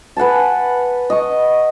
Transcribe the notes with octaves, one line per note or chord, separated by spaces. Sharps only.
B4 F#5 G#5 A5
D#5 C#6